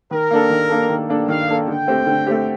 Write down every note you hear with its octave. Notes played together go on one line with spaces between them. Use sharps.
D#3 A#4
A#3 D4 A4
D#3
A#3 D4 A4
D#3
A#3 D4 A4
D#3 F5
A#3 D4 A4
D3 G5
A3 C4 G4
D3
A3 C4 G4